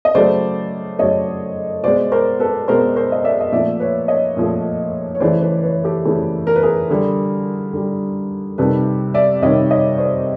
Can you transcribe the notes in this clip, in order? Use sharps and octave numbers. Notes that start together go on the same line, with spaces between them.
D#5
C#3 F#3 A3 C5 D5
C#3 F#3 A3 C#5 D#5
B2 G#3 C5 D5
A#4 C5
A4 B4
B2 G#3 A#4 C5
A#4 C5
D#5
D5 E5
D#5
A#2 F3 A3 D5 E5
B4 C#5
C#5 D#5
A#2 F3 A3
C#5
C#3 E3 A3 C5 D5
B4 C#5
B4 C#5
G4 A4
C#3 E3 A3
A#4
B4
G#4 A#4
D3 G3
D3 G3
C3 D#3 G3 A4 B4
D5 E5
C3 D#3 G3 C#5 D#5
C#5 D#5
C5 D5